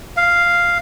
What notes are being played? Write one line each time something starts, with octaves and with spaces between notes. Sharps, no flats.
F5